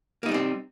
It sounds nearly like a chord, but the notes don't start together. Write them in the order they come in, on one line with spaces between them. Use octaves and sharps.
A#3 D#4 G3 G#3 C4